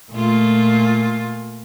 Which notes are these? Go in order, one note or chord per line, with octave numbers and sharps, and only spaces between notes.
A#2 A3 F4